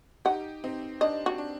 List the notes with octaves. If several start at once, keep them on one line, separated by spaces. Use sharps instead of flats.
D#4 G4 F#5
C4 D#4
D4 D#5
F#4
D4